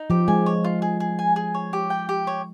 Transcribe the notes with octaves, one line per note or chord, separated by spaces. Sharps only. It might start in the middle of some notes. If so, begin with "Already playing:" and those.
Already playing: D#4
F3 G4
G#3 G#5
C#5
F4
G#4
G#4
G#5
G#4
C#5
G4
G5
G4
C#5